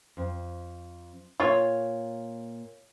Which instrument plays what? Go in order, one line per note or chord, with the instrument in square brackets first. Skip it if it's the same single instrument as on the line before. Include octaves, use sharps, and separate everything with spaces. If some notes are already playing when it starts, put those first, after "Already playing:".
[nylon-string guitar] F2
[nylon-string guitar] A#2 [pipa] F4 C#5